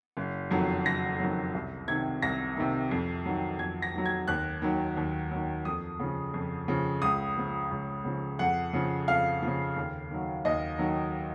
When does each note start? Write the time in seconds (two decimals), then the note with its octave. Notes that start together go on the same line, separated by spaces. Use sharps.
0.17 F#1
0.51 F2 D#3 F#3
0.86 F#1 A#6
1.19 F2 D#3 F#3
1.54 C2
1.88 C3 D#3 G#6
2.22 C2 A#6
2.57 C3 D#3
2.91 F2
3.25 D#3 F#3
3.59 F2 G#6
3.82 A#6
3.94 D#3 F#3
4.06 G#6
4.28 D#2 F#6
4.62 D#3 F#3
4.97 D#2
5.31 D#3 F#3
5.65 F2 D#6
5.99 C#3 F3
6.34 F2
6.68 C#3 F3
7.02 C#2 D#6
7.37 C#3 F3
7.71 C#2
8.05 C#3 F3
8.39 F2 F#5
8.73 C#3 F3
9.08 F2 F5
9.42 C#3 F3
9.76 D#2
10.10 D#3 F#3
10.45 D#2 D#5
10.79 D#3 F#3